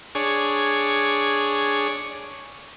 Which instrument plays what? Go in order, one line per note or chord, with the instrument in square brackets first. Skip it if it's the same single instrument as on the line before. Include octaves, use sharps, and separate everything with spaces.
[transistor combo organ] D4 G#4 C#5